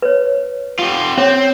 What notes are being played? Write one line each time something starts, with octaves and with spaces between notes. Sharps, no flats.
B4 C#5
F4 G4
C4 C#4 C#5 D6